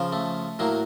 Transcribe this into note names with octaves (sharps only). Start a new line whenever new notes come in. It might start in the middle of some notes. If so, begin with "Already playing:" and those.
Already playing: C#3 F3
A3
A2 F#3 A#3